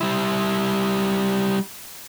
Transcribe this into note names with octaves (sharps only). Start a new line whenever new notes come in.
G3 E4